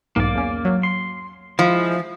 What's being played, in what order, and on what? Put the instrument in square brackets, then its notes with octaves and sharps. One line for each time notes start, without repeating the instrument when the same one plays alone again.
[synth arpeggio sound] B1 E2 G#2 [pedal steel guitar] A#3 D5
[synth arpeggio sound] E2 C#4
F#3
[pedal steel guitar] C6
[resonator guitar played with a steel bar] F3 [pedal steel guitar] G#3 E4